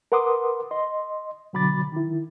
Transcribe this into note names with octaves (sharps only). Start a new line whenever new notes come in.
A#4 B4 F#5 C6 D6 D#6
D#5 C6
B2 D3 F#3 B5 D6 A6
D#3 E4